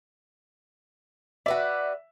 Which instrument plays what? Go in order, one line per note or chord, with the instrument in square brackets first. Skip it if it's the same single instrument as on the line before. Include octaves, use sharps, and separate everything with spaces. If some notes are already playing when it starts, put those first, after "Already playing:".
[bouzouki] F#4 B4 D5 [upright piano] E5